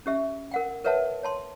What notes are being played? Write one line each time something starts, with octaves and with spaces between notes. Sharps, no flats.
C#4 G4 E5
A#4 F#5 G5
A#4 B4 C#5 E5 F#5 A5
C#5 A5 C6